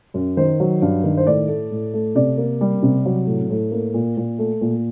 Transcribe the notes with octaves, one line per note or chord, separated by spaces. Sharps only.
F#2
D#3 C5
F#3
G2
D#3
C5
A2 D5
A3
A2
A3
C3 D5
A#3
G3
C3
F#3
A2
A2
A#3
A#2
A#2
A3
A#2